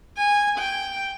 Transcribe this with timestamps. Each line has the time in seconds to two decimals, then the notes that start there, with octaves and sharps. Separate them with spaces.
0.17 G#5
0.59 G5